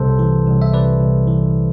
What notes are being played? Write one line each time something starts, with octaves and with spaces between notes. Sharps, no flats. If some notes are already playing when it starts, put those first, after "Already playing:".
Already playing: C2 C3 A4 C5
E3
C2
E5
C3 B4 D5
C2
E3